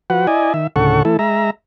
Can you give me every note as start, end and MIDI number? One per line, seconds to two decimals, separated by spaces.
0.10 0.27 53
0.10 0.27 66
0.10 0.27 71
0.10 0.27 78
0.27 0.53 64
0.27 0.53 74
0.27 0.53 75
0.27 0.53 80
0.54 0.67 51
0.54 0.67 76
0.76 1.03 38
0.76 1.03 45
0.76 1.03 49
0.76 1.03 69
0.76 1.03 78
0.76 1.03 85
1.05 1.17 52
1.05 1.17 57
1.05 1.17 64
1.05 1.17 69
1.19 1.50 56
1.19 1.50 76
1.19 1.50 82